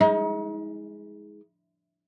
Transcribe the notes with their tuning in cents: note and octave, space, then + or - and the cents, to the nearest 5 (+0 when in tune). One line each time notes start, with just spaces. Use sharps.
G#3 +0 D#4 +40